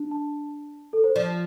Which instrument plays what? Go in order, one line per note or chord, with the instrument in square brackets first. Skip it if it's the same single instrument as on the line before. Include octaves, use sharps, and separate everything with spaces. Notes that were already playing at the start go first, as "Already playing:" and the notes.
Already playing: [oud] D4
[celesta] A5
A4
C5
[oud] F3 [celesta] D5